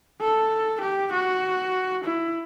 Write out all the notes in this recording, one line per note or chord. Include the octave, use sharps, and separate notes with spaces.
A4
G4
F#4
E4